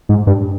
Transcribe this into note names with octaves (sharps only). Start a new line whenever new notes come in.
G#2
G2